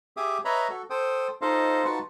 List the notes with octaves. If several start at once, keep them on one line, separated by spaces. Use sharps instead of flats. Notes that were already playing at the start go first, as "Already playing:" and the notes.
G4 G#4 E5 D6 D#6
B4 C#5 D#5 E5 A#5 B5
F#4 A4
A4 C5 G5 D#6
D#4 F4 A4 C5 D#5 F5
D#4 F4 F#4 B4 F#5 A5